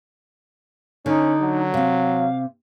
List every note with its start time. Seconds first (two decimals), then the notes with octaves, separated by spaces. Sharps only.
1.06 D3 C#4 D#4
1.41 F#3
1.74 C3 C4 F5